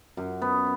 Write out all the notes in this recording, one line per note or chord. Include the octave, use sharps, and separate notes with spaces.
F#2
B3